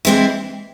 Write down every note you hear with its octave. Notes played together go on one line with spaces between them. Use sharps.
E3 G#3 C4 E4